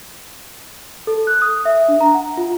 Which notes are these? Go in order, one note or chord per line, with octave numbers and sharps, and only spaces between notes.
A4
F#6
D#6
E5
D4
A#5
F#5
F4